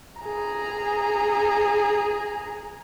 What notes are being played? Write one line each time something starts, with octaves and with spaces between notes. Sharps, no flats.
G#4 A#5